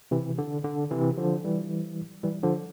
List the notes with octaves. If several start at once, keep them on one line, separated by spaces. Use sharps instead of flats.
C3 E3
D3
D3
C3 E3
D3 F3
E3 G3
E3 G3
D3 F3